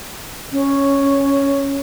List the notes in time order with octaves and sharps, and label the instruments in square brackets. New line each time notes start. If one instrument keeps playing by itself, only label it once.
[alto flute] C#4